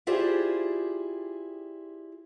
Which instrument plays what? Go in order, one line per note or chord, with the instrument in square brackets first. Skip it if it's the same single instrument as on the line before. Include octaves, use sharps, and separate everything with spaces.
[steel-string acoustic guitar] E4 F4 G4 G#4 C5 D5